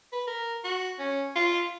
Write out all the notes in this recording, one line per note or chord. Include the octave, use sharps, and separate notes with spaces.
B4
A#4
F#4
C#4
F4